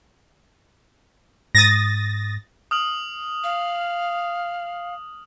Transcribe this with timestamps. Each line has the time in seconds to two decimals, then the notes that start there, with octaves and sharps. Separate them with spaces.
1.55 G#2 D#6 A6 A#6
2.71 D#6 F6 F#7
3.44 F5